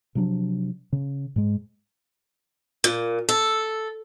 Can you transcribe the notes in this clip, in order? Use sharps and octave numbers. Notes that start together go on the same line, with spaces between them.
C3 F3 F#3 D4
C#3
G#2 G#3
A#2
A4